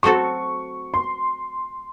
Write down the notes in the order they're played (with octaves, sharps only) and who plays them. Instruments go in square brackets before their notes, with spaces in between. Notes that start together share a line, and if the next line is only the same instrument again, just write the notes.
[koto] F#3 A3 C4 F#4 A4 [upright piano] C#6
[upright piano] C6